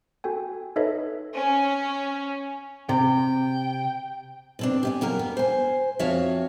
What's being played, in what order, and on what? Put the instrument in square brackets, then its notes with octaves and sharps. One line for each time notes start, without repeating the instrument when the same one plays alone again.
[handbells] F#4 A4 G5 G#5
D#4 A4 B4 C#5 D#5 E5
[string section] C#4
[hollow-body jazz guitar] C3 [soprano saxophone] G5
[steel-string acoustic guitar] B2 C4 D4
G4 E5 G#5
F#2 B2 A#3 A#4
B3
C5 G#5
F2 F3 F#4 C#5 E5 F5